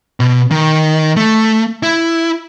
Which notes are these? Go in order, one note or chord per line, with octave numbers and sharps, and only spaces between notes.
B2
D#3
A3
E4